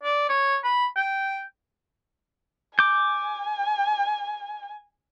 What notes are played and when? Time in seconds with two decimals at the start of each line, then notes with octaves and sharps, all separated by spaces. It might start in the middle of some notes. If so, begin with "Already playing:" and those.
0.03 D5
0.29 C#5
0.64 B5
0.96 G5
2.79 G#5 D6 G6